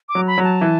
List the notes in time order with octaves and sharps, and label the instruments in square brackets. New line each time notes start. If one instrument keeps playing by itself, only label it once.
[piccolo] D6
[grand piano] F#3
[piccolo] B5
[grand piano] F#3
[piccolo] A5
[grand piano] E3